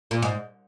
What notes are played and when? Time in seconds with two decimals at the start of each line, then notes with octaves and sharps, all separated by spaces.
0.11 A#2
0.22 G#2